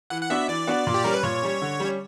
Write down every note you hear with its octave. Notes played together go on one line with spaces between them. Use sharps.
E3 F#5
F#5
B3 D4 F#4 E5
E3 D5
B3 D4 F#4
A#2
G4
G3 C#4 A#4
B4
A#2 C#5
G3 C#4
D3
G3 C#4